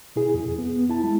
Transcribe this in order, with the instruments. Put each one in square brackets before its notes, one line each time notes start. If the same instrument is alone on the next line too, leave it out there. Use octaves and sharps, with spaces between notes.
[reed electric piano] B2 E4 G#4
F2
B3
E4 A5
G#3 E4